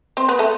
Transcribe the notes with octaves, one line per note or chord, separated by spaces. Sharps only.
C4 C5
B3 B4
A3 A4